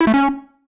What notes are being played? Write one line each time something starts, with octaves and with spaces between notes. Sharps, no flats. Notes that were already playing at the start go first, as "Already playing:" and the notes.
E4
A3
C#4